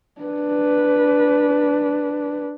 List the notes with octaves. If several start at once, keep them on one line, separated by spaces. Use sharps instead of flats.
D4 B4